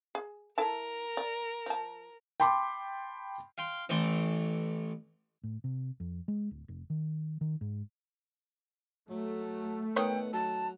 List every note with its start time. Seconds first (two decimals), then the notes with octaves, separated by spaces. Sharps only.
0.15 G#4
0.58 E4 A4 A#4 A5
1.17 D5
1.66 F3 A5
2.40 G5 A5 B5 C6 D6
3.58 F5 G5 C6
3.89 A1 E3 A3 G5 C6 D6
5.44 A2
5.64 C3
6.00 F2
6.28 G#3
6.51 D1
6.68 F1
6.90 D#3
7.41 D#3
7.61 G#2
9.10 F#3 A3
9.96 D#3 B3 D#4 C#5 G5
10.33 F#3 A5